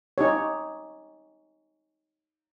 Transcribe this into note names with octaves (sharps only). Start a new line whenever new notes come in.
D#4 G4 C#5